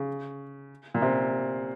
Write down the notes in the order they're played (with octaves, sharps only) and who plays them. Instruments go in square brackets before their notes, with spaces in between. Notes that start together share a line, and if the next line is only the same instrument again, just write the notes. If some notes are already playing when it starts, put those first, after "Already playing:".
Already playing: [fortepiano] C#3
A#2
C3